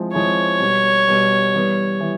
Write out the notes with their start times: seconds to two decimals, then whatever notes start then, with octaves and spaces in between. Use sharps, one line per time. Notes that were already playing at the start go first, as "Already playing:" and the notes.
Already playing: F3 G#3 C4 E4
0.13 F3 G#3 C4 E4 C#5
0.60 B2 G3 B3
1.07 B2 G3 B3
1.53 E3 G3 B3
2.01 E3